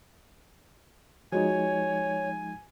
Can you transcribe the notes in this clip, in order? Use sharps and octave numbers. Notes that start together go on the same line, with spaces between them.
F3 G#3 D#4 F#4 C#5 G#5